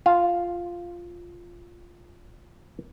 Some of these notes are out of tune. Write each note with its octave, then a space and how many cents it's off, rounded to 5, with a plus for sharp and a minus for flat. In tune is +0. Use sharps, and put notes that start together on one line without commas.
F4 +0 F5 +0 G#5 +45